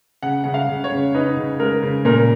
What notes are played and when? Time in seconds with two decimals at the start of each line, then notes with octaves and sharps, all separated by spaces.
0.23 C#3 F#5
0.44 C#3 F#5
0.54 F5
0.69 C#3
0.84 C#5
0.92 C#3
1.15 D#4 B4
1.37 C#3
1.60 G#3 A#4
1.83 C#3
2.05 A#2 A#4